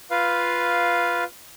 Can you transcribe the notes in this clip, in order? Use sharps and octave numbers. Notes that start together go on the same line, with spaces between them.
F4 B4 F5